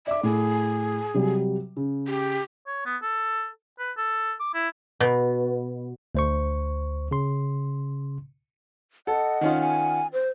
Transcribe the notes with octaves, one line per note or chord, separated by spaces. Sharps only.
D5 E5 D6
A2 G#4
C3 F#3 G3
C#3
G4
C#5
B3
A4
B4
A4
D6
E4
B2
D2 C5 C#6
C#3 C6
A4 D#5 F#5
D#3 C#4 F4
G#5
C5